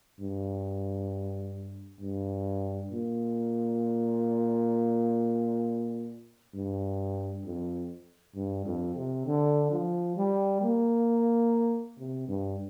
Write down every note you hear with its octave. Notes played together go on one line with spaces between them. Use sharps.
G2
G2
A#2
G2
F2
G2
F2
C3
D3
F3
G3
A#3
C3
G2